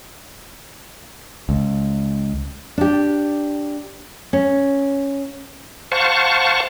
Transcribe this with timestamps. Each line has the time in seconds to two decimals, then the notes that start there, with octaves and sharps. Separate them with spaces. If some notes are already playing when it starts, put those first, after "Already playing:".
1.49 C#2
2.78 D4 G4
4.33 C#4
5.92 C5 F5 F#5 A5 C#6